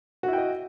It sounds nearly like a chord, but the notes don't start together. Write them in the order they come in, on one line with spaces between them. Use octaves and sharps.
F#4 E4 G5 D#5